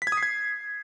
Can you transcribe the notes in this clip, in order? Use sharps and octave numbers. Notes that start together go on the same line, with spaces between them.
B6
G#6
D#6
C7
G#6